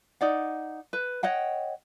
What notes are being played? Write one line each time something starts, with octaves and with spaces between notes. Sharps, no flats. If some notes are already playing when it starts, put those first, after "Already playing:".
D#4 D5 F#5
B4
C#5 D#5 F#5 G5